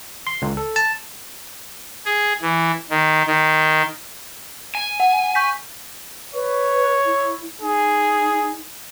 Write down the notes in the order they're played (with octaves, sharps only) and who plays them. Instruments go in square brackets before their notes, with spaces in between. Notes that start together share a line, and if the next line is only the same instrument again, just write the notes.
[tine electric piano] C6
C#2
A4
A5
[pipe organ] G#4
E3
D#3
D#3
[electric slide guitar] G#5
[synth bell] F#5
C#6 G6 B6
[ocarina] B4 [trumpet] C#5
[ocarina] E4
[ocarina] D#4 [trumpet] G#4